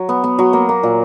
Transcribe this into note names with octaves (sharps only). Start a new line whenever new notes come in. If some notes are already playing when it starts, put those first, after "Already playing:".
Already playing: F#3
B3
B3
F#3
A#3
A#3
A#2